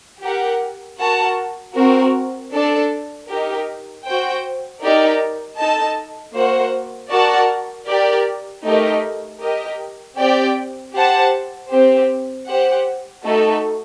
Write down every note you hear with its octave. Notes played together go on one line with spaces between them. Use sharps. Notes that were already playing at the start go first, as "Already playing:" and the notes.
G4 A#4 F#5
F#4 A#4 F#5 A5
C4 F#4 A#4
D4 A4 D5 A5
D#4 G4 A#4
F#4 C5 G5
D#4 G4 A#4 D5
D#4 A4 D#5 A5
A#3 F#4 C5 F#5
F#4 A#4 D5 F#5 A5
G4 A#4 D5
A3 D#4 G4 A#4 D#5
G4 A#4 D#5
C4 G4 D5 G5
G4 C5 F#5 A5
C4 G4 C5
G4 C5 F#5
A3 D#4 F#4 A4